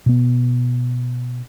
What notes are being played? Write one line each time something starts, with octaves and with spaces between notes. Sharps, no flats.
B2 B3